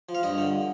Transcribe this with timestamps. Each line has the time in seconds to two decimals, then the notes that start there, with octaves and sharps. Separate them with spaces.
0.09 F3
0.15 F5
0.23 G2 D#5
0.38 D3